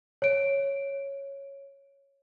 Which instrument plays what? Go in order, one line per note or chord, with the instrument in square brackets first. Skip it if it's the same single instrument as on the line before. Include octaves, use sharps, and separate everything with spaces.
[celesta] C#5 D7